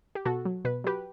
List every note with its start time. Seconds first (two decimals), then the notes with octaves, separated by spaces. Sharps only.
0.15 G4
0.25 B2 F#4 A4
0.45 F#3
0.65 B2 B4
0.84 F#3 G4 B4